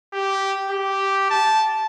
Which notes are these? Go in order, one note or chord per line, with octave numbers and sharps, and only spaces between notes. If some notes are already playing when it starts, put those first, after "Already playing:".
G4
G4
A5